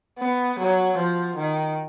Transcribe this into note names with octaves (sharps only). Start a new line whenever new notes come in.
B3
F#3
F3
D#3